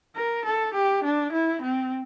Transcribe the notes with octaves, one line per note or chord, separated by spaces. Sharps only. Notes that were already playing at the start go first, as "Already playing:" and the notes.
A#4
A4
G4
D4
E4
C4